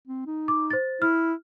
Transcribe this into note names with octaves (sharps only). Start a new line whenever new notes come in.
C4
D#4
D6
C5 A6
E4 F6